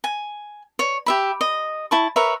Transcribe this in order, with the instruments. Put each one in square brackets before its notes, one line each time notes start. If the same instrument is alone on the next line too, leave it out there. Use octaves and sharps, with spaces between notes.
[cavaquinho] G#5
C#5
G4 E5 B5
D#5
E4 A5 C#6
A#4 B4 C#5 E5